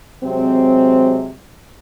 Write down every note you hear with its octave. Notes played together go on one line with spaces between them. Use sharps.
C3 F#3 G#3 C4